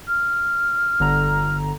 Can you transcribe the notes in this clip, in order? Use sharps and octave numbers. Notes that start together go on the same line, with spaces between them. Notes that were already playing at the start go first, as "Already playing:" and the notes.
F6
G1 D3 A#5